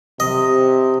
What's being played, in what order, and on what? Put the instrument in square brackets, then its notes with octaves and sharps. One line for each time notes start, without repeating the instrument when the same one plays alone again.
[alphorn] C3 [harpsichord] D#5